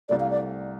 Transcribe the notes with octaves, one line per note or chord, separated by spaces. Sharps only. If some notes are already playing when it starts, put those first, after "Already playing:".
C2 C3 A3 D5
F5
D5